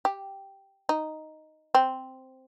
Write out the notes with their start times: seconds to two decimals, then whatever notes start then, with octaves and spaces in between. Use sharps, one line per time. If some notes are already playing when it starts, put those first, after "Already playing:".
0.05 G4
0.89 D#4
1.75 C4